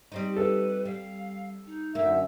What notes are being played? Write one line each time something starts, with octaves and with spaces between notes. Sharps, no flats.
G3 C4 D#4
A4 B4
G3 F5
D#4
F#2 D3 A#3 E5